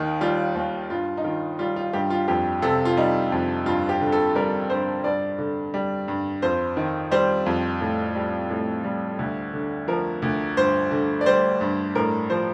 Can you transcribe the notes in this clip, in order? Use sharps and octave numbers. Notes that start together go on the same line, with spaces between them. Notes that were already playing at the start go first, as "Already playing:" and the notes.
Already playing: D#2 D#3
G3 F4
D#2
G2 F4
D#4
D#3 F4
G3 F4
F4
G2 G4
F4
F2 G4
C3 A4
F4
G3 D#4
F2
G2 F4
G4
D3
A4
G3 A#4
G2 C5
G2 D5
D3
G3
G2
F2 C5
D#3
G3 C5
F2
A2
G3
A2
G3
D2
D3
F3 A#4
D2
G2 C5
D3
D5
G3 C5
G2
A2 A#4
F3 C5